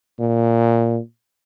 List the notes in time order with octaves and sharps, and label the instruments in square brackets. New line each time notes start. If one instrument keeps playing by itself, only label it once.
[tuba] A#2